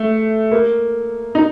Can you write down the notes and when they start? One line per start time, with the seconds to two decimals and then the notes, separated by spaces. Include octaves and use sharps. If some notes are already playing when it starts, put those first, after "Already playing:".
Already playing: A3
0.52 A#3
1.35 D#4